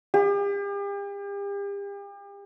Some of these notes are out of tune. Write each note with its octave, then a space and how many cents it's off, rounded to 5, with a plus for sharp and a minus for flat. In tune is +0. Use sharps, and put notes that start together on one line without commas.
G4 +40